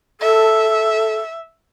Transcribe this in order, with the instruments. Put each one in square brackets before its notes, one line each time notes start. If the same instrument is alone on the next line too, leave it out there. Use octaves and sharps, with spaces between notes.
[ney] A4 [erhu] E5